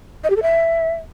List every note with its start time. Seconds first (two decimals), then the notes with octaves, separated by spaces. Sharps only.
0.24 D#5
0.30 G4
0.36 A4
0.42 E5